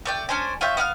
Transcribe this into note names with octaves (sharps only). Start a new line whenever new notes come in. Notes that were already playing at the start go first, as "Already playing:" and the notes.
A3 D5 G5
C#4 D4 C5 G#5
F4 C#5 E5 G5
B3 E5 F5 F6